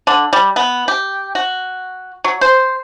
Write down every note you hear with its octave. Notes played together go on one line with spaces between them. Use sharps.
D3
G3
B3
G4
F#4
F#3
C5